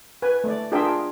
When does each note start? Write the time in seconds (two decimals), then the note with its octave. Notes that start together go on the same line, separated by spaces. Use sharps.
0.22 B4 G#5
0.44 A3 D5
0.72 D4 F4 G#4 A#4 E5 G5